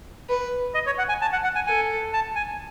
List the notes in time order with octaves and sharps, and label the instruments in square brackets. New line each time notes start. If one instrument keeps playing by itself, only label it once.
[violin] B4
[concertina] D#5
C#5
F#5
G#5
A5
F#5
F#5
G#5
[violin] A4 [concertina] G#5
[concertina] A5
G#5